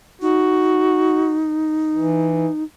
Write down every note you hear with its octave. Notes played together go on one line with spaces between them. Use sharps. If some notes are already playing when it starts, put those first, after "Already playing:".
D#4 F#4
E3